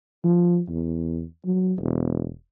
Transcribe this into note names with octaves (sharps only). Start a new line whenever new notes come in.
F3
E2
F#3
E1